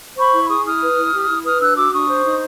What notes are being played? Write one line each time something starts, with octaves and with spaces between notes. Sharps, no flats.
C5 B5 C#6
E4
G#4 C#6 D#6
E4 D#6 F6
B4
E4
G4
E4
B4 D#6 F6
D4 E6 F#6
F#4 D6 E6
D4 C#6 D#6
C5
D#4